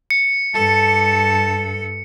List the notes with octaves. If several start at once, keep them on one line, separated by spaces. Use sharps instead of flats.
C#7
G2 A4 A5